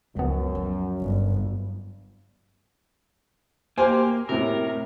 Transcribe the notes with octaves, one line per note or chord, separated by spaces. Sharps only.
C#2 F#2 F3 A#3 B3
F#3
G1
A#3 G4 C5 G#5
A2 C3 A#4